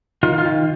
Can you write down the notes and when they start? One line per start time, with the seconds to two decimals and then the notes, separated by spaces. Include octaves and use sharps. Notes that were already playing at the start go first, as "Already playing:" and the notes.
0.23 D#3 F4
0.38 F4
0.46 D#3